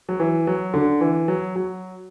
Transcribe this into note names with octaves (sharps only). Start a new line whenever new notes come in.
F#3
E3
F#3
D3
E3
F#3
F#3